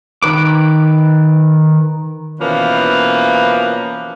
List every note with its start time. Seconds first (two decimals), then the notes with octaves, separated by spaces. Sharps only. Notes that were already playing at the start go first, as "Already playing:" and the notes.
0.23 D#3 B4 D6
2.40 B2 E3 F3 A#3 C#4 B4